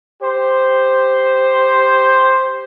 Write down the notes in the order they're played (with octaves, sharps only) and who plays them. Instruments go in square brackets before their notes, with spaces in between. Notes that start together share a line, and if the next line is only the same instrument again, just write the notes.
[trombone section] G4 C5